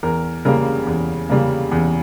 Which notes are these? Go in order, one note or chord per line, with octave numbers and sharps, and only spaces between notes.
E2 A#4
C#3 G3 A#3 A#4
E2
C#3 G3 A#3
E2